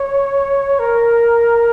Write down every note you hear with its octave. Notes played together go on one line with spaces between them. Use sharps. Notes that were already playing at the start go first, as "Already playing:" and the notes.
Already playing: C#5
A#4